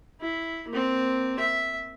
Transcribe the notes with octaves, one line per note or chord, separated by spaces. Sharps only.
E4
A#3 C4
E5